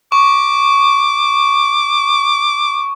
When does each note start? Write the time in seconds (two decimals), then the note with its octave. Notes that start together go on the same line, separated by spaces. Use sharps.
0.12 C#6 D6